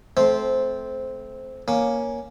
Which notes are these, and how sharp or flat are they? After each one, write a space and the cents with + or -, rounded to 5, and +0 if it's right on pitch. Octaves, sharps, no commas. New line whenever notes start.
A3 -25 C4 -5 C5 +0
A#3 +10 C#4 +0